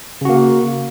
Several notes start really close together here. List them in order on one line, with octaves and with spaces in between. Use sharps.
C#3 F#4 A#3